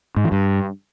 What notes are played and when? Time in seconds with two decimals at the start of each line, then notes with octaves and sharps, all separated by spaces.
0.16 G#2
0.24 E3
0.32 G2